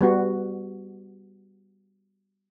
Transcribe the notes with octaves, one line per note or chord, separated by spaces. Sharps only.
G3 B3 F#4